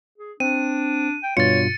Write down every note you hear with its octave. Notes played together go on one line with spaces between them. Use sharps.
G#4
C4 D4 D#7
G5
G2 B2 F4 C#5 A6 C#7